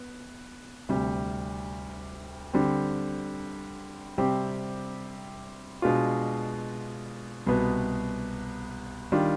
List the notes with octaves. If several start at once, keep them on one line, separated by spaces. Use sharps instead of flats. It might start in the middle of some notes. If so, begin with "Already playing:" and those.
Already playing: B3
D2 C3 G3
D3 G3 C4
C3 G3 C4 G4
B2 G#3 D4 F4
C2 B2 B3
D#3 G3 D4 F4